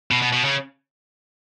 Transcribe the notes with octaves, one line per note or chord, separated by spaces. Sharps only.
B2
B2
B2
C#3